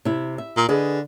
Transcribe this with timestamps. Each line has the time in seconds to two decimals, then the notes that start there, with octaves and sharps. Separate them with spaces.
0.05 C3 E4
0.38 E5
0.57 A#2
0.69 D3 G#4 B4 D#5